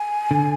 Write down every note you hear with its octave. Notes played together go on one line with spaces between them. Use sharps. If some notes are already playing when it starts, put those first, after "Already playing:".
Already playing: G#5
D3